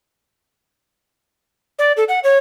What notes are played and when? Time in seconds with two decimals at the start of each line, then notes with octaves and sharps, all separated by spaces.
1.79 D5
1.97 A4
2.09 F#5
2.24 C#5